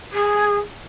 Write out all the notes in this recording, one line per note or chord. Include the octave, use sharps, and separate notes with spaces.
G#4